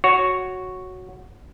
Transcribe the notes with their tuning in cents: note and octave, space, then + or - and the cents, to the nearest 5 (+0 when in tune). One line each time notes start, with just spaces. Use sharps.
F#4 +0 C#5 +0